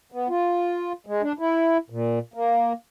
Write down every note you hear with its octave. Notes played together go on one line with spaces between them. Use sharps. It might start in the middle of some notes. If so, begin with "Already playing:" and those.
B3
F4
G#3
D4
E4
A#2
A#3